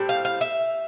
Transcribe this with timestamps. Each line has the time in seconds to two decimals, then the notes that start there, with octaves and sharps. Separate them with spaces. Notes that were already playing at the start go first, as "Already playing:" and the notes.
Already playing: A2 G3 C4
0.09 F5
0.25 F5
0.41 E5